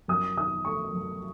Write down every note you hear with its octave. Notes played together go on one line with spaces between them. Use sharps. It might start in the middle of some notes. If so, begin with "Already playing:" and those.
F#2 D#6
D#3 D#6
A3 C#6
F#2